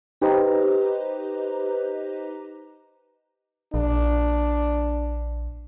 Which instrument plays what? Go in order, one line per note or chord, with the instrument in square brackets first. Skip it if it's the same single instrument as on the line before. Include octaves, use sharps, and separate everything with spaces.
[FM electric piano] D#4 G4 B4 C5 D#5 A#5
[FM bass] A#1 [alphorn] D4